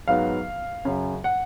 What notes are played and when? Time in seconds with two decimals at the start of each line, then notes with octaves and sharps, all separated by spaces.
0.08 G#2 F#3 B3 F5
0.85 F#2 C#3 F#3
1.24 F#5